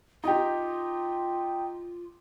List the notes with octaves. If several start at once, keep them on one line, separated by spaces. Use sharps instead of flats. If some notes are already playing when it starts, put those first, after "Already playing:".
D#4 F4 G4